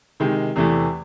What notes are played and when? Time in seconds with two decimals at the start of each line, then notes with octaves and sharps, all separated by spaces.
0.20 C3 D#3 G#3
0.56 E2 C3 E3 A3